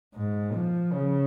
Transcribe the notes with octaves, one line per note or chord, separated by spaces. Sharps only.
G#2
F3
C#3